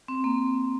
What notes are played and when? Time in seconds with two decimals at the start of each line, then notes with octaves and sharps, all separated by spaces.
0.08 C4
0.24 A#3